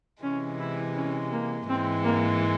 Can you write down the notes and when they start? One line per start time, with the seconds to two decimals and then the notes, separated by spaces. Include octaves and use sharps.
0.23 C3 E3 G#3 C#4
0.60 E4
0.96 C#4
1.32 A#3
1.68 G#2 E3 G#3 C4
2.05 A#3